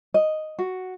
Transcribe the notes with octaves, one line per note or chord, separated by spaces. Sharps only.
D#5
F#4